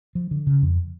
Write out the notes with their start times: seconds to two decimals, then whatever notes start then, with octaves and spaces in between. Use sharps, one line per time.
0.15 F3
0.31 D3
0.47 C#3
0.62 F2